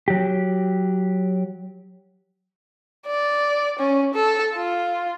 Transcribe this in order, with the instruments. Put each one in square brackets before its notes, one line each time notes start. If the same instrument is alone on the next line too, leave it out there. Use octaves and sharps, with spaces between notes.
[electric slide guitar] F#3 G4
[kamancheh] D5
C#4
A4
F4